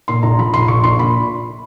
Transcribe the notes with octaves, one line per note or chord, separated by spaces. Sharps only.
A#2 C6
A#1 A#5
F3 B5
A#1 C6
A#1 C#6
A#1 C6
A#2 B5